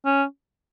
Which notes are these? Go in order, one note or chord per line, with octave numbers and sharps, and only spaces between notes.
C#4